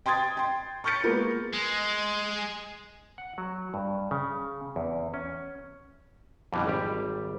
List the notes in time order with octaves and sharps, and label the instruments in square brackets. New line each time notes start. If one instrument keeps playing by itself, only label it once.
[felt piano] G5 C6 D#6 G#6 A6
G5 C6
C#6 F6 G6 A6 C#7
G#3 A#3 B3 F4 A#4
[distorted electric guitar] G#3
[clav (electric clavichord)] F#5
F#3
G2
C#3
E2
C#4
F2 B2 D3 E3 F3 G3
G#1 G3 G4